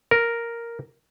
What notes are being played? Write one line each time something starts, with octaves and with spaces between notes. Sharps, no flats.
A#4